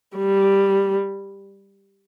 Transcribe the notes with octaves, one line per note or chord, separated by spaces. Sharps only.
G3